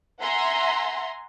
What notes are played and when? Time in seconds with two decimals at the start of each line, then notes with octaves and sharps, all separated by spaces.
0.22 E5 F#5 G#5 A#5 C6